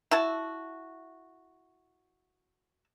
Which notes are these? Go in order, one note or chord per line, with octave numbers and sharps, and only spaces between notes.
E4 F#4 A5